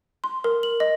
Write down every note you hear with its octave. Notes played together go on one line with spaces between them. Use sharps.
C6
A#4
F#7
D#5